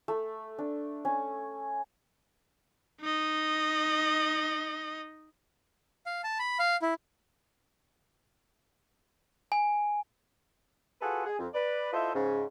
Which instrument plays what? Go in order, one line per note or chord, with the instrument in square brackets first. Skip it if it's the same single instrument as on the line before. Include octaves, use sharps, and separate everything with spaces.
[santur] A3
D4
C#4
[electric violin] D#4 D#5
[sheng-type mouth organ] F5
A5
B5
F5
E4
[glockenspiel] G#5
[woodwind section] F4 F#4 G#4 A4 B4 F#5
G#4
F2
B4 D5
E4 F4 A4 C5 D#5 E5
G#2 C#3